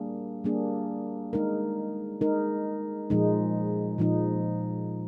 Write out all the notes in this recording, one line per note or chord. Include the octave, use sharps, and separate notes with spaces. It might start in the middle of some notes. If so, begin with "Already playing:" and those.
Already playing: G3 A#3 D4 G#4
G3 A#3 D4 G#4
G#3 D#4 A#4
G#3 D#4 A#4
A#2 F3 G#3 D#4
A#2 F3 G#3 D#4